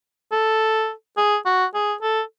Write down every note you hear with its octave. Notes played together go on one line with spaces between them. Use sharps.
A4
G#4
F#4
G#4
A4